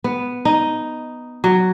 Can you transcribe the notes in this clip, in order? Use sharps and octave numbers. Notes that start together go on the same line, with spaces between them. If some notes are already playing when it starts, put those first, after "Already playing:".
B3
D#4
F#3